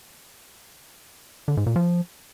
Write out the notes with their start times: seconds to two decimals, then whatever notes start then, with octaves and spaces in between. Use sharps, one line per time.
1.48 D3
1.57 G#2
1.66 A#2
1.76 F3